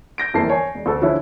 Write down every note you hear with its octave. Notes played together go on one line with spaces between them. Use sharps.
G6 A#6 D7
G1 F2 E3 A#3 A5 C7
C#5 G#5
E1
D2 A4
D3 F3 C#4 E4